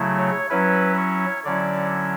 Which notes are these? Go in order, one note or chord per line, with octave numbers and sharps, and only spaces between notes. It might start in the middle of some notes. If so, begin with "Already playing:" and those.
Already playing: C#3 F#3 A3 E4
C#5
F#3 C#4 E4 B4
C#5
D3 F#3 C#4 E4 D5